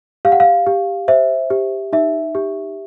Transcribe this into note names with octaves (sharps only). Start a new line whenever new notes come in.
G4 F5
F#5
F5
G4
C5 E5
G4
D#4 E5
G4